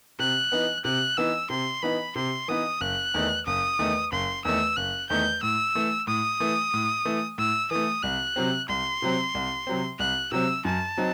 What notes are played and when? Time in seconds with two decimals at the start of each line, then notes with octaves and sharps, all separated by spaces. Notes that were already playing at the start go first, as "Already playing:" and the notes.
0.19 C3 F#6
0.52 E3 B3 D#4
0.85 C3 F#6
1.17 E3 B3 D#4 E6
1.50 C3 C6
1.83 E3 B3 D#4 B5
2.16 C3 C6
2.48 E3 B3 D#4 D#6
2.81 F#1 F#6
3.14 E2 D#3 A3
3.46 F#1 D#6
3.79 E2 D#3 A3
4.12 F#1 C6
4.45 E2 D#3 A3 E6
4.76 F#1 F#6
5.09 E2 D#3 A3 G6
5.43 A2 E6
5.75 E3 A3
6.07 A2 D#6
6.40 E3 A3
6.74 A2
7.05 E3 A3
7.38 A2 E6
7.71 E3 A3 D#6
8.03 C2 F#6
8.36 C3 F#3 C4
8.69 C2 C6
9.02 C3 F#3 C4
9.35 C2
9.67 C3 F#3 C4
9.99 C2 F#6
10.32 C3 F#3 C4 E6
10.65 F#2 A5
10.98 F#3 C4 D#4